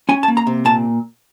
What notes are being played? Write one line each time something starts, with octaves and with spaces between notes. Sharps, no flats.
C#4 G#5
A5
A#3
A#5
C3
A#2 A5